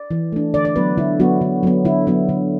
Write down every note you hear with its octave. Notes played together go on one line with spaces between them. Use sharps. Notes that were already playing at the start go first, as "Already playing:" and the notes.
Already playing: D5
E3
A3 D4
D3 D5
D5
F#3 B3 B4
D3 E4
F#3 B3 F#4
D3
F#3 B3
D3 E4
F#3 B3
D3